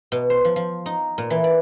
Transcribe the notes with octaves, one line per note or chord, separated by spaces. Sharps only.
B2
C5
F3
F3
D#4
A#2
E3
D5